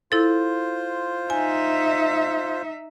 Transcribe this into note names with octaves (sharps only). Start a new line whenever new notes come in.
E4 F4 A4 C5
D#4 E5 G#5